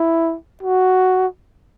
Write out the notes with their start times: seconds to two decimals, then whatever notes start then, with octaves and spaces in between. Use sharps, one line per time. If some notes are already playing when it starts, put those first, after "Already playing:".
Already playing: E4
0.63 F#4